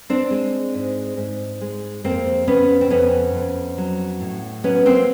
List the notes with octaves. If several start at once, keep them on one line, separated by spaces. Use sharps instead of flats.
C4 D4
G#3
G#2
G#2
G#3
F2 A#3 C4
C#3 B3 C#4
C4
F2 B3 C#4
F2
F#3
A2
F#3 B3 C#4
A#3 C4